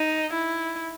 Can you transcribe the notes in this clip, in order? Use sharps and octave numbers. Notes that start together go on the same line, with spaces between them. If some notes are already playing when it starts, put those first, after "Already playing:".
Already playing: D#4
E4